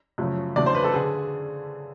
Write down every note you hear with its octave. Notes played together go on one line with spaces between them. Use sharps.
F#2 C#3 F3 A3
E2 C#3 F#3 A3 D4 D5
C5
B4
A4
D3 G#4